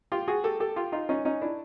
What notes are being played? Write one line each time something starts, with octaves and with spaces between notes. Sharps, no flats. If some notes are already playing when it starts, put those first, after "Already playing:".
F4 G4
F#4 G#4
G4 A4
G4 A4
F4 G4
D#4 F4
C#4 D#4
C#4 D#4
D4 E4